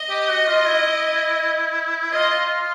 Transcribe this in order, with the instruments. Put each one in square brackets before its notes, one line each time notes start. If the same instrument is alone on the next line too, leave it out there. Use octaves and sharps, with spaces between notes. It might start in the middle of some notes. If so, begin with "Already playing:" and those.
Already playing: [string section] D#5
[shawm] G4
F#4
F4
E4
[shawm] F4 [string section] D#5